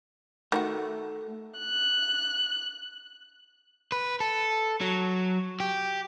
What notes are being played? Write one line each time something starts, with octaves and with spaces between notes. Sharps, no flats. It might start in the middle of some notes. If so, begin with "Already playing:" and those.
D#3 A3 E4 F#4
F#6
B4
A4
F#3
G4